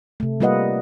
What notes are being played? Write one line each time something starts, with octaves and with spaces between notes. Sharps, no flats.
C3 A3
G3 A#3 F4 B4 D#5 F#5